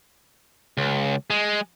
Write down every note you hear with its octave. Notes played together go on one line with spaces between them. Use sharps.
C#2
G#3